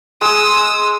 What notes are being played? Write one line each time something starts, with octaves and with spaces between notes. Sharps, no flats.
G#3 G#4 D#6 E6